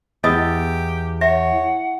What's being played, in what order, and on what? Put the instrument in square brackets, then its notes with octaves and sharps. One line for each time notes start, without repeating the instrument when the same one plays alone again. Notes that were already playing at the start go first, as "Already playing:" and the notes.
[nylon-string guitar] E2 [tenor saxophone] G4 [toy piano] D#5 D#6 E6
[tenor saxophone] C#5 [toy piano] E5 [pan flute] F#5